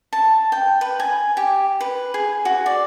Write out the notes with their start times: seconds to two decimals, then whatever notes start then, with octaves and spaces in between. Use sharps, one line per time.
0.13 A5
0.52 G5
0.81 B4
1.00 G#5
1.37 G4
1.80 B4
2.14 G#4
2.45 F#4
2.66 D5